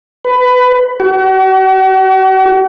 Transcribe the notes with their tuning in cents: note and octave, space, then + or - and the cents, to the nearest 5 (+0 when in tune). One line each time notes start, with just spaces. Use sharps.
B4 +20
F#4 +45